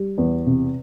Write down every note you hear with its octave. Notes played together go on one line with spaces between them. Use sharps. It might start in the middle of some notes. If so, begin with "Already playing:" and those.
Already playing: G3
E2
C3